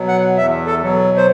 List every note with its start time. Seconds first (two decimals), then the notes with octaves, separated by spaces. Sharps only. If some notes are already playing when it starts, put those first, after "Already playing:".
Already playing: B2 F#3
0.08 F#5
0.37 E2 E5
0.67 A4
0.82 B2 F#3
1.17 C5